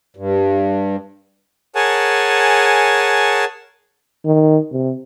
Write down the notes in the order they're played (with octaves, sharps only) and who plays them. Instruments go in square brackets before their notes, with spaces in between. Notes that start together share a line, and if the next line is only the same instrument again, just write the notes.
[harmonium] G2
[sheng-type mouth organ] G#4 A#4 C#5 F#5 G#5 A5
[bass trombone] D#3
C3